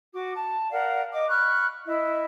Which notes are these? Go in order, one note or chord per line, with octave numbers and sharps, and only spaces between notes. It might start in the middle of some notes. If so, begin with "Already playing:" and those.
F#4 D6
A5
A#4 D5 F5 F#5
D#5 D6
B5 C#6 F6 F#6
E4 D#5 E5